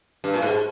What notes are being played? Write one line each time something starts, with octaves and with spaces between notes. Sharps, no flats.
G2
A#2
G#2